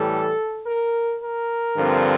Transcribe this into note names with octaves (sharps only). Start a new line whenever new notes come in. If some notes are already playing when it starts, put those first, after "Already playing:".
Already playing: A2 E3 G3 A4
A#4
A#4
G2 D3 F3 C4